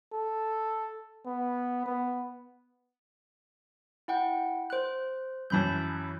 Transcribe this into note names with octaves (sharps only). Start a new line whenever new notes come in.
A4
B3
B3
E4 F#5 G5
C5 F#6
F#2 E3 A5 B5 G6